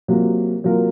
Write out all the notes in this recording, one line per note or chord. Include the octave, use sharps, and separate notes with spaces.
C3 F#3 A#3 F4 A#4
C3 F#3 A#3 F4 A#4